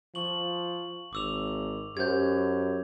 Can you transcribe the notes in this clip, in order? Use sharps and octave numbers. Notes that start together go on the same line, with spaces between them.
F3 C#6 F#7
G#1 D6 E6 F7
F#2 G4 C5 G6 G#6